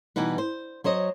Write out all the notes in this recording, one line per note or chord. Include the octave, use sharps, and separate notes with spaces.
B2 E3 G3 D#4 B4
C5
F#3 C5 C#5 D#5